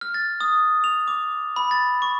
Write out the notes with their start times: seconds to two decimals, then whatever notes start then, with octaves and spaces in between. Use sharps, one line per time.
0.01 F6
0.14 A6
0.41 D#6
0.84 F7
1.08 D6
1.56 B5
1.71 A6
2.02 C#6